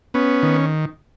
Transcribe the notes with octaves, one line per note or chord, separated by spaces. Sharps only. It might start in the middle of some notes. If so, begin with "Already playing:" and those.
B3 C#4
D#3